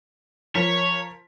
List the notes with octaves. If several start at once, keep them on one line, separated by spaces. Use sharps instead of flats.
F3 A#4 C#5 B6